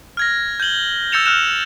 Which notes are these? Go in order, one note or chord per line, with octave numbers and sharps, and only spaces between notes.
F6 G#6 A#6
G6 G#6 F#7 G7
E6 G6 A6 C#7 E7 F7
F6 F#6 E7 F7